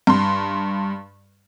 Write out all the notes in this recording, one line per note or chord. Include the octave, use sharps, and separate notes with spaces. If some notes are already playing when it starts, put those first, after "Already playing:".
G2 C6